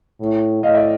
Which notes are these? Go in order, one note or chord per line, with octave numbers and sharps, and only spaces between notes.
A2
A2 D#5 F5
D5 E5